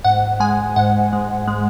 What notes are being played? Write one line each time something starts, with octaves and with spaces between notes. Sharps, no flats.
G#2 F#5
G#3 G#5
G#2 F#5
G#3
G#3